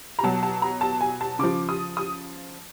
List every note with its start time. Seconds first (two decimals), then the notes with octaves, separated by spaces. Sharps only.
0.19 A#5
0.23 B2 F#3 A5
0.43 A5
0.62 A#5
0.81 A5
1.01 G#5
1.21 A5
1.39 C#3 F3 D6
1.69 D#6
1.97 D#6